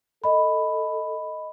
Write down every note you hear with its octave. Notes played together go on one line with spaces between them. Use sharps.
A4 D#5 B5